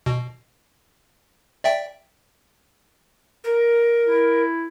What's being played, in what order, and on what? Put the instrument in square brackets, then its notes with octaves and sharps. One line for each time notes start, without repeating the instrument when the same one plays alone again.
[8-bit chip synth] B2
D5 E5 G5
[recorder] A#4
[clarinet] E4